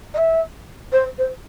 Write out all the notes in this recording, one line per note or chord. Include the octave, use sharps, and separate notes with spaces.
D#5
E5
C5
C5